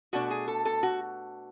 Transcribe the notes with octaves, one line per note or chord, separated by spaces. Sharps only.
B2 A3 D4 F#4
G#4
A4
A4
F#4